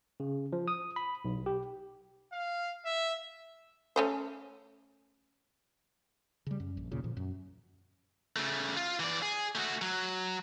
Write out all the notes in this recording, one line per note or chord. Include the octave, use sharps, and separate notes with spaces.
C#3
F3
D#6
B5
B1
G4
F5
E5
A3 C#4 C5
C#3 G3
F#2
A#1
D#2 A#2 C#3
A#2 D3 F3
F#2
C#3 A3
F4
E3 D5
G#4
A3 F#4
F#3